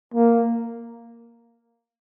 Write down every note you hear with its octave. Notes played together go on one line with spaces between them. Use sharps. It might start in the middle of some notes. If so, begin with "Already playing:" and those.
A#3